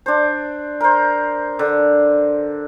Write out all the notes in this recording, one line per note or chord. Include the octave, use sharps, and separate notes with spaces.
D4 C5
A#4 C5
D3